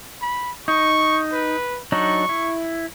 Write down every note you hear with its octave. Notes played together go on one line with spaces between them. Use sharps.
B5
D#4 C#6
B4
F#3 D4 D#4 C#6
E4